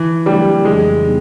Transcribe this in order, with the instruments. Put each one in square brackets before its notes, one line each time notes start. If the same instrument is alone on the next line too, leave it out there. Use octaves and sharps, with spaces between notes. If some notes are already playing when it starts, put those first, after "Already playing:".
Already playing: [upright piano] E3
[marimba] C#3 F#3 A3 D4 G4 [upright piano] G3
[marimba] F2 C#3 E3 [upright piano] G#3
[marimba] G3 B3 D#4